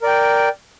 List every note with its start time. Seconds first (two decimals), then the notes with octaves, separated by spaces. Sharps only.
0.01 A#4
0.04 D5
0.07 G5